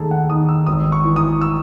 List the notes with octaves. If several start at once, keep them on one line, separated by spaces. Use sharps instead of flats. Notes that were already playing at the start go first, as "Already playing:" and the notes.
Already playing: D#2 A3 G#4 A4
F#5
D#3 D#6
E6
G#1 D#6
C#6
E3
D#6
E6